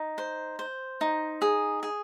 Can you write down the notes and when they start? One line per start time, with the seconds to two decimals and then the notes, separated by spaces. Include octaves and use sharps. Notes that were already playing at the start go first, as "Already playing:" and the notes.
Already playing: D#4
0.18 C5
0.59 C5
1.01 D#4
1.42 G#4
1.83 G#4